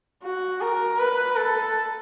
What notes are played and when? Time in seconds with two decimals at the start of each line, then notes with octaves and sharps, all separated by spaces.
0.24 F#4
0.61 A#4
0.98 B4
1.36 A4